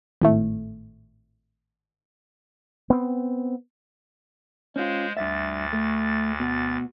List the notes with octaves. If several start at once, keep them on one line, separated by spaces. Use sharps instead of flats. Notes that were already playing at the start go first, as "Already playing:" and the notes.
G#1 A2 A3
B3 C4
G#3 C#4 F4 C5
D2 G2 E5 A6
A3
B2